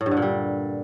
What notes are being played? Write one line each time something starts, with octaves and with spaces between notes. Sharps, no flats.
A2
G2
D3
A#2
G3